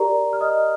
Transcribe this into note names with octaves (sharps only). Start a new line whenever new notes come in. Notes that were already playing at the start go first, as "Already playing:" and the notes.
Already playing: G4 A#4 D5 A#5
F6
D#5 D#6